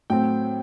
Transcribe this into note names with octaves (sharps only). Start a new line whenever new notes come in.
A2 F#3 A3 C4 G5